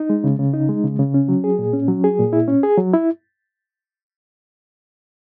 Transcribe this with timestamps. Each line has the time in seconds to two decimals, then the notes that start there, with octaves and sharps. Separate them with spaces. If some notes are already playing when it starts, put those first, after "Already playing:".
Already playing: D#4
0.10 G#3
0.24 C#3
0.39 C#3
0.53 D#4
0.69 G#3
0.84 C#3
0.99 C#3
1.14 C#4
1.28 F#3
1.44 G#4
1.59 A#2
1.73 C#4
1.88 F#3
2.04 G#4
2.19 A#2
2.33 E4
2.48 C#4
2.63 G#4
2.78 F#3
2.94 E4